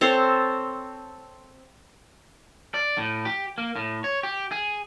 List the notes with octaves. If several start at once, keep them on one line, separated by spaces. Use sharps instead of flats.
C4 A4 C5 C#5
D5
A2
G4
A#3
A2
C#5
G4
G#4